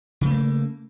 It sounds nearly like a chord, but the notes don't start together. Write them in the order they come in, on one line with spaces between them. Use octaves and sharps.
C#3 A3 A#3